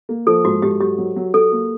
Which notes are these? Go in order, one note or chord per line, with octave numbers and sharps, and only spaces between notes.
A#3
F3 A4
G#2 F#4
G#2 G4
F#3 G4
F#3
F#3
F#3 A4
A#3